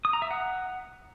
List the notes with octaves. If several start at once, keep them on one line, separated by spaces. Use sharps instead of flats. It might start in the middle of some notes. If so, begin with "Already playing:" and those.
D#6
A#5
E5
F#5